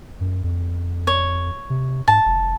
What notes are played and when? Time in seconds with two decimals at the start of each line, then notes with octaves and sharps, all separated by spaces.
0.21 F#2
0.44 F2
1.07 C#5
1.70 C3
2.08 G#2 A5
2.26 F1